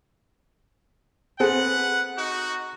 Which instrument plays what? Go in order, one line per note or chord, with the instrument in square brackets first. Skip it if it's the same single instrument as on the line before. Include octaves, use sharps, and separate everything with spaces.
[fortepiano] C4 G#4 A4 [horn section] B4 F#5
[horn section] D#4 F#4